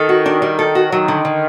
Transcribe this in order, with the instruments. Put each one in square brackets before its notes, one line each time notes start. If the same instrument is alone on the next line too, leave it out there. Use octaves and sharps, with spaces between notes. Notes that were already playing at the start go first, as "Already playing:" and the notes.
Already playing: [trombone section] D#3 [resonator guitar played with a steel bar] A4
[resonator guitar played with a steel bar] F#4
D4
G3
A4
F#4
[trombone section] D#3 [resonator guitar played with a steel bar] F#3
[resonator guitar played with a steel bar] D3
D3